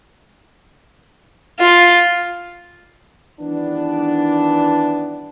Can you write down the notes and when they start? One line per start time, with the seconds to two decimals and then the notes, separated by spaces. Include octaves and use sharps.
1.59 F4
3.40 D#3 E3 G3 B3 D4